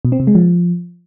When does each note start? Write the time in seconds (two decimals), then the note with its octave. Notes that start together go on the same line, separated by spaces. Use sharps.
0.05 B2
0.12 C4
0.20 C3
0.27 G#3
0.35 F3